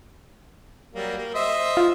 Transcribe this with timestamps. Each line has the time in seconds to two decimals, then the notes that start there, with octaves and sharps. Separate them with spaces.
0.94 F#3 G3 A#3
1.18 A#3
1.34 C5 D#5 E5
1.77 F4